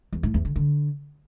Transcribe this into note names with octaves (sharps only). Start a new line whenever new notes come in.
E2
A2
E2
D3
D3